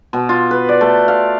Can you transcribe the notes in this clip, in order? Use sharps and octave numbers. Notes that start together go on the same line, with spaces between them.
B2
F4
B4
D5
A3
F5